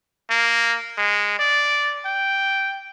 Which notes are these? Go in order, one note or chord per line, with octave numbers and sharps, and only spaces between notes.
A#3
G#3
D5
G5